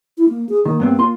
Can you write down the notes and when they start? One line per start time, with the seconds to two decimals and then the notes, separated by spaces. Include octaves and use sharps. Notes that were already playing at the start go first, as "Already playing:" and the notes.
0.17 E4
0.29 A#3
0.49 G#4
0.65 D#3 A#3
0.80 G2 B3 C4
0.99 F4 C6